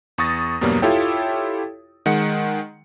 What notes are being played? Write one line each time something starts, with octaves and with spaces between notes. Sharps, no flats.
E2 C#6 D#6 A6 A#6
E2 G2 B2 F#3 G3 A#3
E4 F4 G4 A4 C#5 G5
D#3 G#3 F#5 C#7